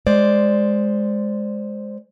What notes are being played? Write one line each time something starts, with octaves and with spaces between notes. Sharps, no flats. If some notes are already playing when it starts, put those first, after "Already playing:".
G#3 C5 D5